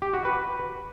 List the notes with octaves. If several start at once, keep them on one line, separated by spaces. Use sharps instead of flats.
G4
F#4
B4